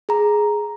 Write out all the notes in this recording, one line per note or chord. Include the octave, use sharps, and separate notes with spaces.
G#4 A#5